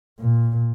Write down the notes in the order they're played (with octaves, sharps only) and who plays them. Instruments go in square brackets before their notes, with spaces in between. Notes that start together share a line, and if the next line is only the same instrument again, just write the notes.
[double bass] A#2